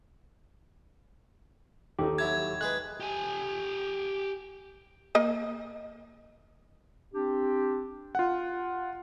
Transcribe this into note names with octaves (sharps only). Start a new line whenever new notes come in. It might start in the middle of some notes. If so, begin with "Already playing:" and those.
D#2 D#4 G4 A4
F#3 E4 A5 G#6
G#3 G#4 B4 F#6
G4 G#5
A#3 D#5
C4 D4 G4
F4 F#5